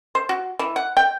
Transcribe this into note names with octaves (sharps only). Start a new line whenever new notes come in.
C5
F#4
E3
F#5
G5